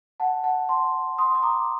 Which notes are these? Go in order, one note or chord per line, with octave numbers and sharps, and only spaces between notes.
F#5 A5
F#5 A5
A5 C6
C6 D#6
D#6
A#5 D6